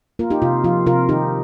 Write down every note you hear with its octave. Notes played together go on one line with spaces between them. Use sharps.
A#3 F4 A#4
D#4 G4
C3 F4
F3 F4
C3 F4 A#4
D#3 D#4 G4